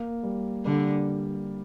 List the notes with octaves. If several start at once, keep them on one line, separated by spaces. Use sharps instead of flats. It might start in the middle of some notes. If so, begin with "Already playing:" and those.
Already playing: A#3
G3
D3 G3